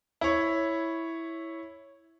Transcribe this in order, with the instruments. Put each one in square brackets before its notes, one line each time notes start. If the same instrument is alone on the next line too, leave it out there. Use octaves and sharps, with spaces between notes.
[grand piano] E4 C#5